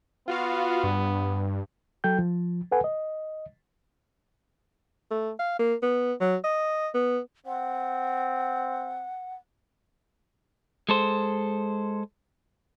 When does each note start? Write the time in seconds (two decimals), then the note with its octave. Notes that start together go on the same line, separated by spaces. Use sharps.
0.28 B3 F4 F#4 F5
0.84 G2
2.04 F#3 A4 G5 G6
2.19 F3
2.72 A4 B4 F#5 G#5
2.84 D#5
5.11 A3
5.39 F5
5.59 A#3
5.82 B3
6.20 F#3
6.44 D#5
6.94 B3
7.46 C4 F#5
10.89 G#3 A4 C5